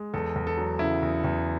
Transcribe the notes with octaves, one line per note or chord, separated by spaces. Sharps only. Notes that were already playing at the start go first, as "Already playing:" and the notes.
Already playing: G#3
E2 A4
E2
A4
F#3
C#3 E4
E2
E2